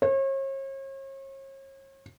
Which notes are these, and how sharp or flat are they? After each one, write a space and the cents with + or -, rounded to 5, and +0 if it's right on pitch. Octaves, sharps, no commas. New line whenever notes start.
C#5 -40